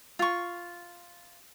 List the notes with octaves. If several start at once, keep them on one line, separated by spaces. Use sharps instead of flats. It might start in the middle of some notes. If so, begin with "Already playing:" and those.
F4 C#6